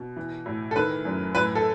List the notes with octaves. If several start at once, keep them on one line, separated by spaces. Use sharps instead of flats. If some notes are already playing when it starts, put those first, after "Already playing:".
Already playing: B2
E3
A2
A4
D#3 B4
F#2
A2 B4
A4